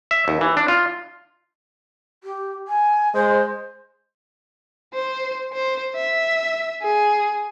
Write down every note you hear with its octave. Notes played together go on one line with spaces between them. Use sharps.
E5
D#2
E3
D4
F4
G4
G#5
G#3 C5
C5
C5
E5
G#4